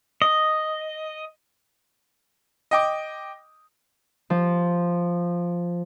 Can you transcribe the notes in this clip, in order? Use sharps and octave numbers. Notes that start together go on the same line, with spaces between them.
D#5
D#5 G5 D6
F3